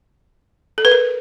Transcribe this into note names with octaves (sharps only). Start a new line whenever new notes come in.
A4
B4
A#4